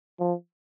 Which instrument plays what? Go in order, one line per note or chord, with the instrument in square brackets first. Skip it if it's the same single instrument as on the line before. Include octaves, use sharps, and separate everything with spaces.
[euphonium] F3